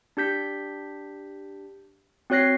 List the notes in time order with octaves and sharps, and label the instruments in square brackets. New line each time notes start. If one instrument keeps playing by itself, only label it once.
[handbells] D4 G4 G6 B6
C4 F#4 C#5 F#6 A#6 C7